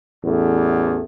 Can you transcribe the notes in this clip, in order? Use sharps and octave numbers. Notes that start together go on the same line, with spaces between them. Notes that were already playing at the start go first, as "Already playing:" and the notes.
A1 E2 A3